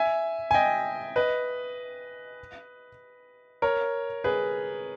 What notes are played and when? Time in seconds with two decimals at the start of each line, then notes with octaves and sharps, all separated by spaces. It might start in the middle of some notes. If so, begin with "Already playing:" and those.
Already playing: E5 G#5
0.51 G#5
0.54 D#5 G5
1.16 B4 D#5
3.62 A#4 C#5
4.24 G#4 B4